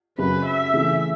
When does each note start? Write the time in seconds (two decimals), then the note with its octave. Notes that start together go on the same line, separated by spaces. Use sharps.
0.18 F#2 C#3 F#3 B4
0.45 E5
0.74 C#3 E3 A3